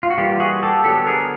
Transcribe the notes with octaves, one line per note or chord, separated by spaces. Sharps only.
F4
F#4
E3 G3 A#3 F4 G4
F#4 G#4
G4 A4
D3 F#3 B3 G4 A4
G#4 A#4